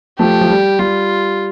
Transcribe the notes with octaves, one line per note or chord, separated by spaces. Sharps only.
F3 A3 G4
F3
G3
G3 F4